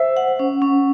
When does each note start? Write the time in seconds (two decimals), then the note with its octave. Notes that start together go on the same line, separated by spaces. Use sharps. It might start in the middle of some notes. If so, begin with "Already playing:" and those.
Already playing: C5 E5
0.17 F#5
0.39 C#4
0.62 C#4